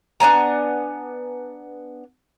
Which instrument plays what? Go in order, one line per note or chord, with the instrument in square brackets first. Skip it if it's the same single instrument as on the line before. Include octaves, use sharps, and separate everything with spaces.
[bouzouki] B3 D4 G#5 A#5